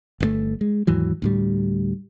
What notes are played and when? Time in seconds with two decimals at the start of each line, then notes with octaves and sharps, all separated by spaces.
0.20 G1 D3 A3
0.61 G#3
0.87 D#2 G#2 E3 F#3
1.22 D2 A2 G3